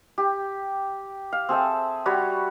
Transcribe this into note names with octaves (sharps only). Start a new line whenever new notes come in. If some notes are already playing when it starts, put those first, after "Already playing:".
G4
F5
C4 G#4 A4 E5
G3 F#4 C#5 B5